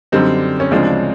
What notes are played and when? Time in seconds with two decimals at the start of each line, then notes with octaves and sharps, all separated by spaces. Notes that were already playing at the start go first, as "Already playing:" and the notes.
0.12 F#2 D3 G3 C4 D#4
0.60 C#4
0.71 D2 C#3 F3 G#3 C4 D4
0.86 D4